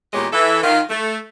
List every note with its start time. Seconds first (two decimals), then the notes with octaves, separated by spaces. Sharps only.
0.13 E2 A#2 G#3 G4 C#5 D#5
0.33 E3 A4 E5
0.63 D#3 F4
0.90 A3